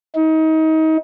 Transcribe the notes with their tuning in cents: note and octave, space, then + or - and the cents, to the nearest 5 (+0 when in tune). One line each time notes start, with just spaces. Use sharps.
D#4 +30